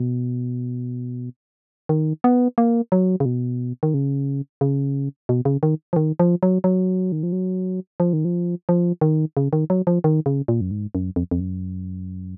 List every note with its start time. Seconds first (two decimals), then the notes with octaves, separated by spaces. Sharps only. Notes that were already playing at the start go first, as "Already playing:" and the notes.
Already playing: B2
1.89 D#3
2.24 B3
2.58 A#3
2.92 F#3
3.20 C#3
3.25 B2
3.83 D#3
3.94 C#3
4.61 C#3
5.29 B2
5.45 C#3
5.63 D#3
5.93 F3
5.96 D#3
6.20 F3
6.43 F#3
6.64 F#3
7.12 D#3
7.23 F3
7.32 F#3
8.00 F3
8.13 D#3
8.25 F3
8.69 F3
9.01 D#3
9.37 C#3
9.53 D#3
9.70 F#3
9.87 F3
10.04 D#3
10.26 C#3
10.48 A#2
10.61 F#2
10.71 G#2
10.95 F#2
11.16 F2
11.31 F2
11.40 F#2